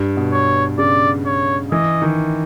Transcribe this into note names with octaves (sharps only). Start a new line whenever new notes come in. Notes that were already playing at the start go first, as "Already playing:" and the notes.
Already playing: G2
B2
C#5
C#3 D5
C#5
E3 D#5
D#3